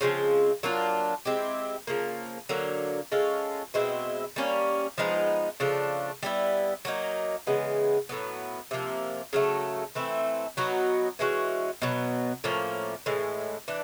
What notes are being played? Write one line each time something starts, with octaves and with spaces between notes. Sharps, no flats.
C#3 F3 G#3 C4
F#3 A#3 D4 F4
G#3 C4 E4 G4
C#3 F3 A#3
D3 F#3 A#3
G#3 C#4 F4 A4
B2 G#3 C4 E4
G3 A#3 C#4
F3 G#3 B3 D#4
C#3 F3 A3 D4
G3 B3 E4
F#3 A#3 D#4
C#3 E3 G#3 B3
A2 F#3 B3
C3 F3 A#3
C#3 F#3 A3
E3 A3 C4 E4
F#3 B3 D#4 F#4
E3 G#3 C#4 F#4
B2 F#3 B3
A2 F3 A#3 C#4
A2 E3 G#3
E3 D4